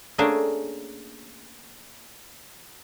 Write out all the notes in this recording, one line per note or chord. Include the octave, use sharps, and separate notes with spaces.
A3 A#3 C#4 D4 G#4 G5